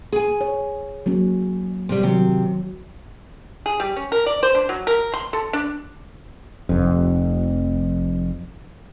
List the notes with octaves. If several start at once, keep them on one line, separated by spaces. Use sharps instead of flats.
G#4 G#5
C#5
F#3 A#3 C#4
C3 G3
C3 D#3 F#3
G#4
G3
C#4
A#4
D5
C5
D4
F#3
A#4
C6
A4
D4
F1 F2